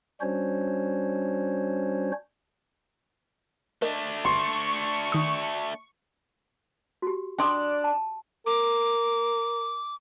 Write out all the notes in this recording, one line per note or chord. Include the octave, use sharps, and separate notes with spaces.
G3 C#4 D4 F#4 C5 C#5
A3 D4 A#4 D#5
G1 C6 C#6
D#3 D#6
F#4 G4
D4 D5 G5 C6 D#6
A5
A#4 D6